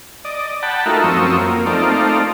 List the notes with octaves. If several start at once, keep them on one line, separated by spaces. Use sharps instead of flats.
D5 D#5
F#5 G5 A5 B5
A3 D#4 F4 F#4 A#4 E5
F#2 F3 C4 C#6 D#6 E6
A#3
A3 C4 D#4 F4 D5